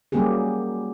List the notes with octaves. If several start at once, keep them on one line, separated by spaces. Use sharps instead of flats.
F#3 G3 A#3 C#4 G4 G#4